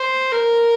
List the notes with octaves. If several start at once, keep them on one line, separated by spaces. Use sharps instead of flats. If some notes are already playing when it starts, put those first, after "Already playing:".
Already playing: C5
A#4